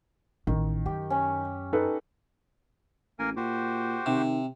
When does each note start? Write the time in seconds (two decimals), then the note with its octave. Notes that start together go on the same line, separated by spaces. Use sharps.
0.47 A1 D#3
0.86 F#2 G4
1.10 C#4
1.73 D#4 A4 B4
3.19 A1 A#3 A#4 G#5
3.36 A#2 F#4 G4 C5
4.06 C3 D#3